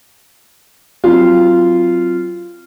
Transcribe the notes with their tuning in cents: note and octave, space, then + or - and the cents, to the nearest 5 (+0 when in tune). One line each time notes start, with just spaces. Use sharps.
F#3 +0 C4 -5 F4 -15